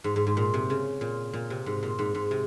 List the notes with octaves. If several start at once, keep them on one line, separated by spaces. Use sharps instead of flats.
G#2
G#2
G#2
A#2
C3
C#3
A#2
A#2
C3
G#2
A#2
G#2
G#2
C3